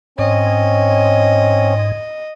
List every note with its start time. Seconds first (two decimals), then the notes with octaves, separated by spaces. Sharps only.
0.18 G#2 C4 C#4 C#5 D#5